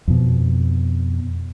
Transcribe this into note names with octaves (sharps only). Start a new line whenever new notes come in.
F2 B2